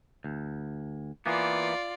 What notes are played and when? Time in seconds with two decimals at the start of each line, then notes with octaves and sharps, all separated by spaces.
0.24 D2
1.26 E3 A#3 B3 F4 D5